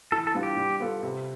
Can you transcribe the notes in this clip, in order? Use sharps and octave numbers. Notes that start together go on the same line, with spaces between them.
E3 A4
A4
G3 B3 D4 F4
G4
G3
B3 F4 A4
C3